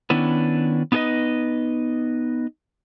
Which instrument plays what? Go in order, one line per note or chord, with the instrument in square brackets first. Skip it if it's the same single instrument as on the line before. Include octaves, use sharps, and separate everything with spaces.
[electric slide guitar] D#3 B3 C#4 D4 E4 B4
B3 D#4 E4 A4 B4 D#5